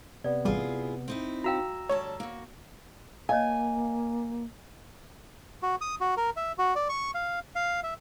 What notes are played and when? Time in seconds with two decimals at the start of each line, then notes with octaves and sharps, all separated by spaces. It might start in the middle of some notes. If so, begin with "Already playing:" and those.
0.24 C3 B3 D5
0.45 A1 G3 E4 F4 G#4
1.08 C4 D#4 E4
1.44 F#4 F5 G5 A#5 E6
1.89 D2 G3 C#5 A5
2.20 A#3 F#4
3.29 A#3 C#5 D#5 F5 G#5
5.63 F#4
5.81 D#6
6.01 F#4
6.17 A#4
6.36 E5
6.58 F#4
6.75 D5
6.89 C#6
7.14 F5
7.55 F5
7.83 E5